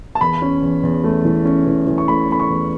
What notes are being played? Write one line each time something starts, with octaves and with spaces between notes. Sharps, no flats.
A5
E2 B5
C#4
E2
E2
A3
E3
C#4
E3
E3
C#6
A3 B5
A3 B5
C#6
E2